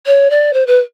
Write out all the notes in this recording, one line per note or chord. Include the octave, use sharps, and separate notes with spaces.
C#5
D5
C5
B4